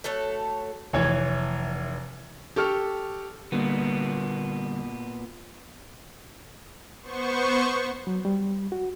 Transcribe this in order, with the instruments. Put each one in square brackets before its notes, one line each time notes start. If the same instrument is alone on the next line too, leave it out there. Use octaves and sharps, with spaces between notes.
[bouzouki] A3 F#4 A4 C#5
[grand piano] F1 E3 C#5 G#6
G4 A4 C#6 F6
[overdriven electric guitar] A#2 B3 [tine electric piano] D3 G3 A#3
[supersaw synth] B3 C5 C#6
[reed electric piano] F#3
G3
F#4